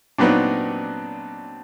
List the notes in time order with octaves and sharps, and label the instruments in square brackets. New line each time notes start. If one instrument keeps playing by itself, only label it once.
[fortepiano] A#2 F#3 B3 D#4 [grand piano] C4 D4